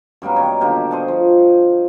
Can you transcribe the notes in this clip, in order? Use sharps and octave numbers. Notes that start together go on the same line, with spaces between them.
F#2 G3 A#3 B3
D#3 E4 C#5 A#5
B2 D3 A#3 G4
C5 D#5 F#5 A5
F3